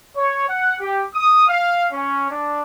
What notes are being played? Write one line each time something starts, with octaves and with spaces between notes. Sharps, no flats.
C#5
F#5
G4
D#6
F5
C#4
D4